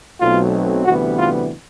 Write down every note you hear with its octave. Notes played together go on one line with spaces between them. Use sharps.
B1 B2 F#3 A3 C4 F4
D2 C3 E3 G3 B3 F#4
F4